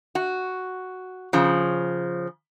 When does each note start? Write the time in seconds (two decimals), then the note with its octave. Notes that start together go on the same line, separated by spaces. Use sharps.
0.15 F#4
1.33 C#3 F3